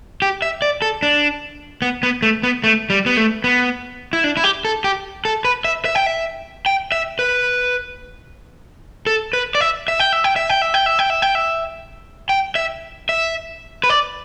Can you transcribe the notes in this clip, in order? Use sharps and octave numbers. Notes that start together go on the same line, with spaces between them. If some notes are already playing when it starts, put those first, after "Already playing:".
G4
E5
D5
A4
D4
B3
B3
A3
B3
A3
G3
B3
A3
B3
E4
D4
E4
G4
A4
G4
A4
B4
E5
E5
G5
E5
G5
E5
B4
A4
B4
D5
E5
E5
G5
E5
G5
E5
G5
E5
G5
E5
G5
E5
G5
E5
G5
E5
E5
B4
D5